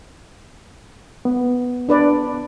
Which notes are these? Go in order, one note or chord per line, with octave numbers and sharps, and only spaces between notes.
B3
D4 B4 D5